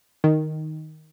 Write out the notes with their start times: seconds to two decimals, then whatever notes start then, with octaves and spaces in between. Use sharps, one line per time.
0.24 D#3